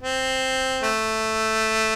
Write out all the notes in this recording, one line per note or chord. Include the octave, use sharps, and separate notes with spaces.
C4
A3